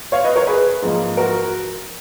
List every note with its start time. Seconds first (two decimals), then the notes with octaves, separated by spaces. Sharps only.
0.12 C#5 F5
0.24 B4 D#5
0.36 A#4 C#5
0.47 G#4 B4
0.82 G#2 F3 A#3 D#4
1.17 F#4 A#4